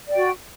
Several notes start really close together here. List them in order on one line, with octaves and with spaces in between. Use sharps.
D5 G5 F#4